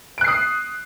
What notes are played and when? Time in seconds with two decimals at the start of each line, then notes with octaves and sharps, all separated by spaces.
0.18 D7
0.21 F#6
0.24 C7
0.28 D#6